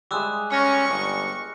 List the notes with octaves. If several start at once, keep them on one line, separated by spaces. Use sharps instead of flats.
G3 G#3 E5 D6 E6 F#6
C#4 C#6 F6 A#6
G1